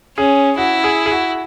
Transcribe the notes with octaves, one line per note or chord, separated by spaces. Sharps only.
C#4 G#4
E4 F#4
G#4
G#4
F#4